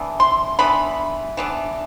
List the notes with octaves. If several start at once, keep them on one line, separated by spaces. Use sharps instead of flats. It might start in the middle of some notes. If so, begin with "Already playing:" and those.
Already playing: E3 B3 D4
C6
E3 B3 D4 B5
E3 B3 D4